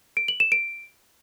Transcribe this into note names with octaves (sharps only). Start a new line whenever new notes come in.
D7
F#7
E7
D7